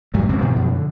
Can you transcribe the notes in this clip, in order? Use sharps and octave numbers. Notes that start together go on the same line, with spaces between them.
G2 F#3 G3 A3
F1 C#2 C3 C4
G2 B2 D#3 F3
F#2 B2 F3
D3